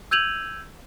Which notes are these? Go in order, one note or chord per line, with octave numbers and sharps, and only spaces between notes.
E6 G6 G#6 D#7 F7 F#7